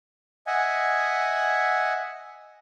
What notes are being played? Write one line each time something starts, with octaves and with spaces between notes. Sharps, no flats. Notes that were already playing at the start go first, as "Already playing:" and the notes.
D#5 E5 F#5 G#5